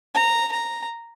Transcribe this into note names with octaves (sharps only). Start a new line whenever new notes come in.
A#5
A#5